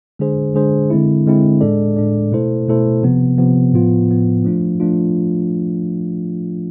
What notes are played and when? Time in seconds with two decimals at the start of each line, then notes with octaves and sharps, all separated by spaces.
0.19 D3 G#3 D4 G#4 C5
0.55 D3 G#3 D4 G#4 C5
0.90 D3 G#3 C4 E4
1.26 D3 G#3 C4 E4
1.61 A2 G#3 D4 A4 D5
1.96 A2 G#3 D4 A4 D5
2.32 B2 A3 E4 A4 C5
2.68 B2 A3 E4 A4 C5
3.03 C3 F3 B3
3.38 C3 F3 B3
3.73 A2 F3 B3 F4
4.09 A2 F3 B3 F4
4.45 F3 A3 D4 F4
4.80 F3 A3 D4 F4